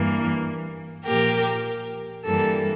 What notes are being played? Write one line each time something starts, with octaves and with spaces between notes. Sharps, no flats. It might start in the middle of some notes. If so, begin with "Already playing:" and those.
Already playing: G2 E3 A#3
A#2 F3 A#3 G4 A#4
G2 E3 G3 A#3 A4